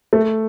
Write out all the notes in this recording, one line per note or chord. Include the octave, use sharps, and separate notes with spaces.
A3